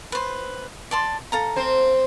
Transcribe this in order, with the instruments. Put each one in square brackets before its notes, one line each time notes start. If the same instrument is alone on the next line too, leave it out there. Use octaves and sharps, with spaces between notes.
[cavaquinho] B4 C5
D5 A5 C6
A4 F5 A#5
[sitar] C4 C5